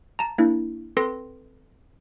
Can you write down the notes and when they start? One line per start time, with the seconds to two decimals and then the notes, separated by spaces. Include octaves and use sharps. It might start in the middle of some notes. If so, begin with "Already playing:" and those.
0.19 A5 A#5
0.38 A#3 D4 E4
0.97 C4 A4 B4 C6 A#6